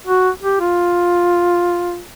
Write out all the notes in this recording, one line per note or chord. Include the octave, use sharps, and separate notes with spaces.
F#4
G4
F4